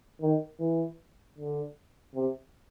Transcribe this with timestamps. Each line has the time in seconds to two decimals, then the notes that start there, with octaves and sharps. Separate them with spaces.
0.22 D#3
0.60 E3
1.38 D3
2.15 C3